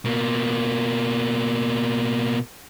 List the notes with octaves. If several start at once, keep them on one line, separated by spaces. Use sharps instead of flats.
B2 A#3